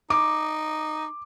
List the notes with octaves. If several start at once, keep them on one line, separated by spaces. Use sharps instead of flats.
D#4 D6